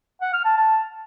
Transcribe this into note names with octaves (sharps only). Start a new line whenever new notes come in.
F#5
F6
A5
A5